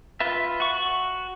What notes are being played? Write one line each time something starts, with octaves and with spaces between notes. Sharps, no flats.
F4 B4 E5
F#4 C#6